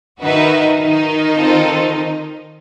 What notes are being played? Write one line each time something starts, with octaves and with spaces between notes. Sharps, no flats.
D#3 D#4 F#4 B4 E5
D#3 D#4
C4 F4 A4